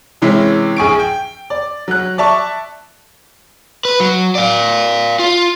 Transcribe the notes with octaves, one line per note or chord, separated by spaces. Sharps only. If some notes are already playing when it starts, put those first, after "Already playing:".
C3 E3 G#3 C#4 E4
A#1 G#4 C#6 D7
G5
D5
F#3 F#6
D5 E5 A5 C#6
B4
F#3
D5 F5
F4